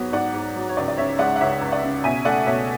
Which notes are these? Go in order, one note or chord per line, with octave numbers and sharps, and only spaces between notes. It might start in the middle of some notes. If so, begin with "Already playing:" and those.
Already playing: G#2 F#3 B3 C#5
G#2 D5 F#5
G#2
F#3
C#5
C#2 D5
D5
C#3 C#5 E5
G#3 D5 F#5
F#5
C#2 C#5 E5
C#2
D5 F#5
C#3
B2 E5 G#5
A3 D5 F#5
B2 C#5 E5